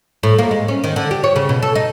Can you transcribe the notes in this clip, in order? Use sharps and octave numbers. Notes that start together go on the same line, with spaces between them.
A2
A#3
G#3
C#4
D#3
D3
G4
C#5
C#3
B2
A4
D#4